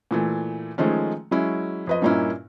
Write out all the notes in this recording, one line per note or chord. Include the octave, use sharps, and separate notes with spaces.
A#2 E3 A3
D#3 F3 G#3 A3 C#4
F#3 G#3 C#4 E4
F2 B4 D#5
G2 A#2 A#3 C#4 D#4 E4